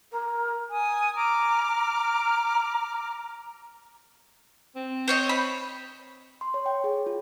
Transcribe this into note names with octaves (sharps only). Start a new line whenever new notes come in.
A#4
G#5 D#6
A#5 D6 F6
C4
C5 C#5 D#5
B5
C6
C#5
G5
G#4
F4